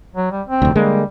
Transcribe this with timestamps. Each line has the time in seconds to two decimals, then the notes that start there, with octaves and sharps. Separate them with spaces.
0.15 F#3
0.31 G3
0.47 C4
0.62 F1 D2
0.75 D3 G3 G#3 A#3